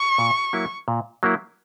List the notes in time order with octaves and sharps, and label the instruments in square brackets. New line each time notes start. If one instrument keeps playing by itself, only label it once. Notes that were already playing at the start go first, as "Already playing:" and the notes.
Already playing: [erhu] C#6
[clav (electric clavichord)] A#2
F#3 A#3 E4
A#2
F#3 A#3 E4